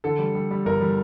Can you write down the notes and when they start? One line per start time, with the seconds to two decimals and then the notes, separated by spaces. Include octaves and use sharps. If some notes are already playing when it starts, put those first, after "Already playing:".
0.04 D3 A4
0.19 G3
0.35 G3
0.51 G3
0.65 G1 A#4
0.81 G3